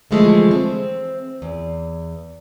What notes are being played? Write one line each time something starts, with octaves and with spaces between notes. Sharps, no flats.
D3 E3 F3 G#3 A3
C4
E2